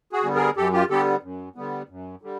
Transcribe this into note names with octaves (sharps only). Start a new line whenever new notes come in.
F#4 G#4
D3 G3 B3
G#4 A#4
F#2 G4 A4
F4 G4
D3 G3 B3 G4 A4
F#2
D3 G3 B3
F#2
D3 G3